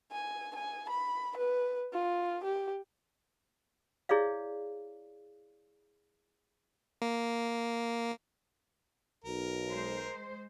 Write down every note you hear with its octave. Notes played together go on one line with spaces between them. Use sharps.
G#5
G#5
B5
B4
F4
G4
E4 G#4 C#5 D5 F5
A#3
B1 A#4
G#3 C5